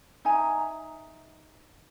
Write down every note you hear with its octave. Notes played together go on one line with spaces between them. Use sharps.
D#4 E5 G#5 A#5